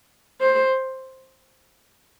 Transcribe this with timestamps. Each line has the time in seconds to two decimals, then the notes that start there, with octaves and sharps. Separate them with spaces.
0.41 C5